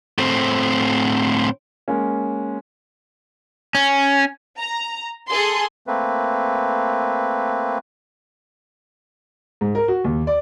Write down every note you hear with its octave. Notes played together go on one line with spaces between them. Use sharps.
A2 C4
G#3 A#3 C#4
C#4
A#5
G#4 A4 C6
A3 A#3 C4 B4
G#2
A#4
F#4
D#2
D5